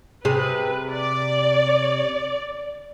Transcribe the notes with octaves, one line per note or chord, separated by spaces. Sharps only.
C3 G#4 B4
D5